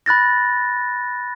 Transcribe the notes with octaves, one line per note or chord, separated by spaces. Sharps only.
B5 F#6 A6 A#6